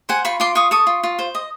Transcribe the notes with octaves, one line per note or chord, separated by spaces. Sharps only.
C5 F#5 G#5
F4 B5 C#6
F4 C6 D6
F4 C#6 D#6
A4 C#6 D#6
F4
F4
C5
D#5